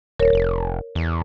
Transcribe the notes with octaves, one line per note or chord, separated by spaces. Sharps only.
D#1 A#4 C#5
F1
E2